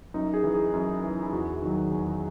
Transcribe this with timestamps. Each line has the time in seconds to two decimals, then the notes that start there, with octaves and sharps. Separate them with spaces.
0.14 F#2 D#4
0.34 G#4
0.44 E3
0.54 G#4
0.73 F#2
1.04 E3
1.23 E4
1.33 E2 F#4
1.62 D#3 F#3
1.92 E2